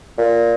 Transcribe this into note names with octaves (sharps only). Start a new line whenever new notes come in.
A#2